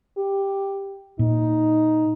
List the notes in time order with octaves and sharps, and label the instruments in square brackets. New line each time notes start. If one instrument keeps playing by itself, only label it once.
[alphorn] G4
[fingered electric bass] A#2 [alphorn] D#4